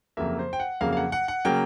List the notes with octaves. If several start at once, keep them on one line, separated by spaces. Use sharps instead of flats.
F2 C#3 F#3 A#3 E5
C5
G5
F#5
F2 C#3 F#3 A#3 F5
F5
F#5
F#5
F#5
C#3 F#3 A#3 G5